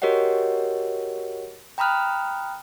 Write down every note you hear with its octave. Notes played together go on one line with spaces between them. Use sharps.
F#4 G4 A#4 C#5 D#5 F#5
G5 A#5 B5 D#6 F6 F#6